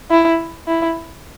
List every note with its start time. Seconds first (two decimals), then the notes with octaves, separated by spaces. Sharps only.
0.11 E4
0.67 E4